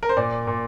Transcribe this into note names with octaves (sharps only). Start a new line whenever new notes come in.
A#4
C5
A#2 D5
A#2